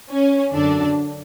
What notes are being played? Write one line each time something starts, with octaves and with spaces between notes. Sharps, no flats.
C#4
F#2 D3 D4